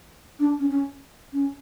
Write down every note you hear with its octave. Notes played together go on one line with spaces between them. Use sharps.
D4
C#4
C#4
C#4